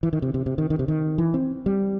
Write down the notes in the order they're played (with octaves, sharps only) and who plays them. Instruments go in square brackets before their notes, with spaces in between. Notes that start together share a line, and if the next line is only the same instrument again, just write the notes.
[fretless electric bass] E3
D#3
C3
C3
C3
D#3
D#3
C3
D#3
E3
C4
G3